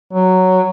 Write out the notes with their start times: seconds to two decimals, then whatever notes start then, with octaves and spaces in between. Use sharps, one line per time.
0.13 F#3